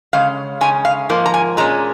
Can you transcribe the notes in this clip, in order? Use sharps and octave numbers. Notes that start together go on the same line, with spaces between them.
C#3 G#3 C#4 F5
C#3 G#3 C#4 G#5
F5
G#2 F3 A#3
A#5
G#5
A#2 G#3 C#4 A#5